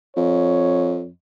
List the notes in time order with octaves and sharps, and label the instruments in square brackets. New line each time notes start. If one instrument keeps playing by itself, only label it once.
[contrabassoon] F2 [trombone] C#5